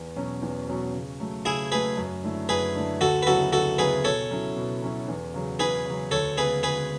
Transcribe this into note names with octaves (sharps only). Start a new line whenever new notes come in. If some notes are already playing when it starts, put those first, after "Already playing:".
Already playing: E2
B2 F#3 C#4
E2
B2 F#3 C#4
C#3
F#3 A3
C#3 E4 G#4
F#3 A3 G#4 B4
F#2
D3 A3 E4
F#2 G#4 B4
D3 A3 E4
D2 F#4 A4
B4
C#3 F#3 B3 E4 F#4 A4
D2 F#4 A4
C#3 F#3 B3 E4 G#4 B4
B2 A4 C#5
F#3 C#4 E4
B2
F#3 C#4 E4
E2
C#3 F#3
E2 G#4 B4
C#3 F#3
D2 A4 C#5
C#3 G#3 B3 G#4 B4
D2 G#4 B4